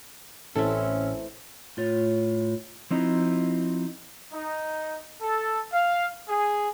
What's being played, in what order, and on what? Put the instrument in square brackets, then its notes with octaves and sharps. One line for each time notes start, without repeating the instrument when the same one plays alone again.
[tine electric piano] A1 E5 [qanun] E3 A3 C4 [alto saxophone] C#4 [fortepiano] A4
[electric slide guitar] A2 F4 C#5
F3 C4 D#4 E4
[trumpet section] D#4
A4
F5
G#4